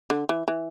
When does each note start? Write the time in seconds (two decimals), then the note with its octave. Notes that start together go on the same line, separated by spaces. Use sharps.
0.10 D3
0.29 E3
0.48 E3